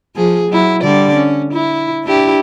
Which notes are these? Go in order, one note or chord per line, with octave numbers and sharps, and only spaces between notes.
F3 G#4
F#3 E4
D3 G3 D5
C#4
E4
D4 E4 G4